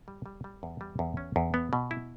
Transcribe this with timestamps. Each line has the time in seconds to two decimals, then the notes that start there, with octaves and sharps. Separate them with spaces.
0.08 G3
0.26 G3
0.44 G3
0.63 E2
0.81 G3
0.99 E2
1.17 C#4
1.36 E2
1.54 B3
1.73 B2
1.91 E4